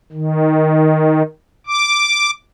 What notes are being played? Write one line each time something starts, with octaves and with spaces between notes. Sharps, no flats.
D#3
D6